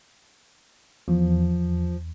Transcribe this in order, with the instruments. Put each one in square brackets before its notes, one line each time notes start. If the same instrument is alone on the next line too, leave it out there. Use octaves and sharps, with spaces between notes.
[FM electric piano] E2 [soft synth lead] F3